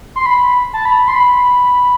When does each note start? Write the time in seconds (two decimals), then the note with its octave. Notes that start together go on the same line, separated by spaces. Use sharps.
0.16 C6
0.26 B5
0.73 A5
0.85 B5
1.08 C6
1.15 B5